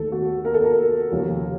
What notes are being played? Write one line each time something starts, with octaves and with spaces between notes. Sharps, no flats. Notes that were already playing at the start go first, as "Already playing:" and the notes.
Already playing: D#2 D#3 A3 A4
F#4
A#4
A4
A#4
D#2 C#3 F3